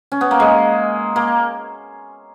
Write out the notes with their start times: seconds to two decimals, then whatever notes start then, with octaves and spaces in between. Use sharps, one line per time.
0.12 C#4
0.21 B3
0.31 A#3
0.40 G#3
1.16 A#3